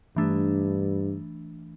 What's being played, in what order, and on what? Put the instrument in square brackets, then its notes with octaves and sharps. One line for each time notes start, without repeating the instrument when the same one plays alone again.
[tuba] G2 [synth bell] E3 A3 D4